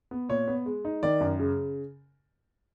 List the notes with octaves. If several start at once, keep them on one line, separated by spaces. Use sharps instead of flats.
B3
A#2 C#5
B3
G#3
D#4
D#3 D5
F#2
C#3